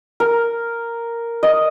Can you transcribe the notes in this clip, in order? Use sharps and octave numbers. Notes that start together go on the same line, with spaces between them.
A#4
D#5